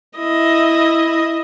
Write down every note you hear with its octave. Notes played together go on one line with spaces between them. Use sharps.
E4 D#5